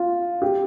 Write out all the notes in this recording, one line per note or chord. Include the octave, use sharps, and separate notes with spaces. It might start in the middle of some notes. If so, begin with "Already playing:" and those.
Already playing: F4
G4